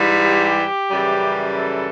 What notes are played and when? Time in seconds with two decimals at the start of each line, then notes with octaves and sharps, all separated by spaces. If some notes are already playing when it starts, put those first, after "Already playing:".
Already playing: G#2 E3 G3
0.25 G4
0.89 F#2 C#3 E3 G3
1.54 A4